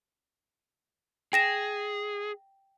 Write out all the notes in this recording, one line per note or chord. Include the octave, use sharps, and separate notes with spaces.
G#4 G5 A#6 E7